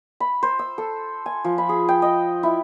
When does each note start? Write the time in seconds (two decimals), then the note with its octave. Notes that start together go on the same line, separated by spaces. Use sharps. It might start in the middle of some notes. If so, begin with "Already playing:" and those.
0.20 B5
0.43 C5
0.59 E6
0.78 A4
1.26 G#5
1.44 F3
1.58 B5
1.69 G#4
1.89 G5
2.02 D#5
2.43 E4